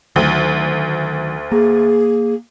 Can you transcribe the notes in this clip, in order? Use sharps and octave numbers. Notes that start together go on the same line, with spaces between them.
D2 D#3 F#3
A#3 G#4